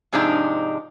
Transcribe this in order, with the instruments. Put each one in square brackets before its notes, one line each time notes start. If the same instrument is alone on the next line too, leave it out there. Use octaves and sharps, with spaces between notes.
[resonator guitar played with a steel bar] G#2 C3 F3 G#3 D4 D#4